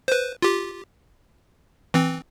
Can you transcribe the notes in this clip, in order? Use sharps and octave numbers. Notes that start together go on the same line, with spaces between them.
B4 C5
F4 G4
E3 C4